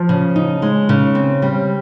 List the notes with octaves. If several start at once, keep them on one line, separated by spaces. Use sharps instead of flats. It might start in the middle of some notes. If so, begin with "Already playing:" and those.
Already playing: F3
C#3
D#4
G#3
C#3
C4
G3